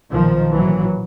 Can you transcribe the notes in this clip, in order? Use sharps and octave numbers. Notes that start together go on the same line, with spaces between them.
B1 A#2 D#3 F3
A#1 A2 E3 F#3